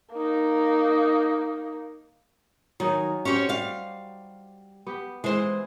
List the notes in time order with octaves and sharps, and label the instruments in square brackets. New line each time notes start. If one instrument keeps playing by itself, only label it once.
[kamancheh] A#3 D#4
[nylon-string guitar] D#3 [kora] F#3 D#4 G#4
[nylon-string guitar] C#4 C#5 [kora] F#4 G4 C5
[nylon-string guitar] G3 F5
[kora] B3 G4
[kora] E3 [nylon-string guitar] G#3 C5